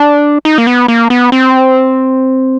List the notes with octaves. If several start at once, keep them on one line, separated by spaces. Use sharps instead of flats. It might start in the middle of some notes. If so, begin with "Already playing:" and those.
Already playing: D4
D#4
A#3
B3
A#3
B3
C4